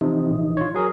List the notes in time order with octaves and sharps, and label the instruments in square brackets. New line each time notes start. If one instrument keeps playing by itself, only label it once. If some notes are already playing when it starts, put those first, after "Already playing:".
[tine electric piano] C3 F3 [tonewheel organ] E3 D#4
[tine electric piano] A#1
F4 C#5
F#3 G#4 A#4